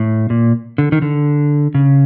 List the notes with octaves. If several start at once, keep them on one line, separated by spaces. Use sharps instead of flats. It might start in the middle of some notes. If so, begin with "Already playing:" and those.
Already playing: A2
A#2
D3
D#3
D3
C#3